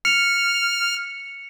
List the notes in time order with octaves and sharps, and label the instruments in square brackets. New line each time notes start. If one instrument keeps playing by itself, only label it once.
[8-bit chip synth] F6 [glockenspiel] C#7 F7